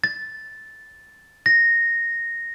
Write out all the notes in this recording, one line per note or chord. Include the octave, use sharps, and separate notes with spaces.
A6
A#6